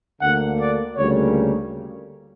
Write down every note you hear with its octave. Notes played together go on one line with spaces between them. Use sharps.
D2 D3 A#3 F#5
D5
D2 C#3 G3 A#3 C#5